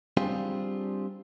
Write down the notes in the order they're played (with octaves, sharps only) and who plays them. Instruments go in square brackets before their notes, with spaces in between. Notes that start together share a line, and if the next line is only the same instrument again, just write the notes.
[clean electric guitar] G3 C4 D4 F4 G4 G#4